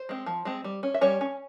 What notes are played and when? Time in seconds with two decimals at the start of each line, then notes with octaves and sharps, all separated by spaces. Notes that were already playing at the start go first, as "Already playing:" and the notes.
Already playing: C5
0.09 G#3 C4
0.26 F3
0.45 G#3 C4
0.64 G3
0.83 C#4
0.94 E5
1.01 G3 C#4 C#5
1.21 C#4